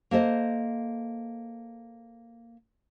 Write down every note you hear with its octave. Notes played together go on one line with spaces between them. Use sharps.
A#3 A4 C5 D#5